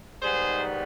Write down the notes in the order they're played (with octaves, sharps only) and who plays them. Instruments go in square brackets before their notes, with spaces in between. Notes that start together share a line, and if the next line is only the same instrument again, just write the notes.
[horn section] G#2 D#3 G3 B3 G#4 C5